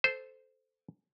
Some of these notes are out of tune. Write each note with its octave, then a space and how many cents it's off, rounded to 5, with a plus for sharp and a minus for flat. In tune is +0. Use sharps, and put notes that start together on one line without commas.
A4 -10 C5 -10